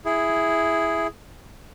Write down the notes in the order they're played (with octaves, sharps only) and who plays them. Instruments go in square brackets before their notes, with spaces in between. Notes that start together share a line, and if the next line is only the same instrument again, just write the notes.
[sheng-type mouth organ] E4 G#4